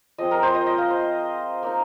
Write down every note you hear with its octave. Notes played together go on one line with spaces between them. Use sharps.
F3 G#3 C4 D#5
A#4
C5
D#5
D#5
F5
C5
A#3 D#4